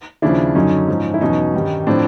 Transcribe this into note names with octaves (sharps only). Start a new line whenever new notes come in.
D#2 C#3 F3 D4 E4
F#2 D3 F#3 C#4 D#4
G#2 F3
E4
E2 B2 F#3 C#4 D#4
G2 D#3 G3
A2 F3 C4 D4